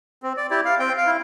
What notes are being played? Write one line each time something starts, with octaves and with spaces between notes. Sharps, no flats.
C4
D5
E4 G4 D5
F5
C4 G5
F5
E4